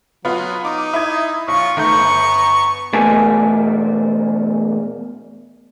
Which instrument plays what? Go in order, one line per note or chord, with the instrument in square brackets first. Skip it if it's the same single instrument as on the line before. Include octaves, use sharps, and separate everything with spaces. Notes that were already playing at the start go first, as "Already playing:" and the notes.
[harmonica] F#3 [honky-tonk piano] B3 F4
[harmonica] D#4 [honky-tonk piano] D6
[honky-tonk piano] E4 D#6 G#6
[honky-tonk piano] B1 [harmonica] F4 C#6
[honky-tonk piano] D#3 A3 G6 [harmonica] B3 A#5 C#6
[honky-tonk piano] G1
[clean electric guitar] E2 B2 A3 A#3 F#4 G#5